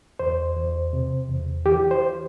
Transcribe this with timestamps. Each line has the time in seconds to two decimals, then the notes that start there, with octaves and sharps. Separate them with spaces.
0.19 E2 C5
0.56 E2
0.93 C3
1.29 E2
1.66 E3 G4
1.91 C5